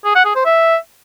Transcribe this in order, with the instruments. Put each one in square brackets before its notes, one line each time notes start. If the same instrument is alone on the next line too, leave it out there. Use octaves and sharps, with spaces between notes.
[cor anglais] G#4
F#5
G#4
C5
E5